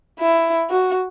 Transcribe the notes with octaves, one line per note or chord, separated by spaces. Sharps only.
E4
F#4